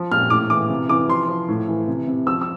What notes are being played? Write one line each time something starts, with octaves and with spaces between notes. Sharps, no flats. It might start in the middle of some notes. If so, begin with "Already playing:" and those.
Already playing: F3
A#2 F6
A2 D6
E3 D6
C3
E3 D6
F3 C6
F3
A2
E3
C3
C3
F3 E6
E6